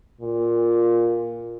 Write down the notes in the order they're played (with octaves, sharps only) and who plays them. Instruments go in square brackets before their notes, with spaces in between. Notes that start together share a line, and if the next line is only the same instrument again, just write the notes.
[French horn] A#2